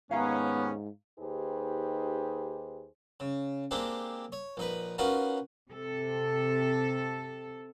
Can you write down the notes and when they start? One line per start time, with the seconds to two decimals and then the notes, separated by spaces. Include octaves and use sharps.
0.11 D#2 G#2 B3 C#4 F5 A#5
1.19 D#2 D#4 G4 G#4 B4 C5
3.20 C#3
3.71 G#3 A#3 C4 D4 G4
4.32 C#5
4.57 A#1 D#4 B4
4.98 B3 C#4 D#4 F4 F#4 A#4
5.70 C3 A4